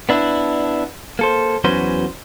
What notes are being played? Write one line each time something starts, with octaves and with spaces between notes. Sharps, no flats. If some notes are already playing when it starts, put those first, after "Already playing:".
B3 D4 E4
A#3 A4 C5
E2 F#3 C#4 F#4 B4 C5